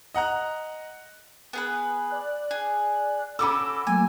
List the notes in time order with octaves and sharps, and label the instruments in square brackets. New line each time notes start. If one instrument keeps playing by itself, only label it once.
[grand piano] D#5 F#5 A#5 F#6
[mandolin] B3 G#4 B4
[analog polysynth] D5 F#6
[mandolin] G#4
[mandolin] C#4 F#4 A4 [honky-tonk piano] B5 D6 E6
[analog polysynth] F#3 A3 A#3 [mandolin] G#5